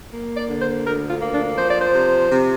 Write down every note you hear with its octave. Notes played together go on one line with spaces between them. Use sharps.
A#3
D5
D3
C5
D2 A#4
F4
A#3
D4
F3 C5
D5
C5
C3
C3